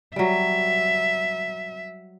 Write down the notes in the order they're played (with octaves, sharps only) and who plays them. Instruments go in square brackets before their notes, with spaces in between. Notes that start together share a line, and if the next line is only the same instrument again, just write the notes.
[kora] F#3 G3 [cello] E5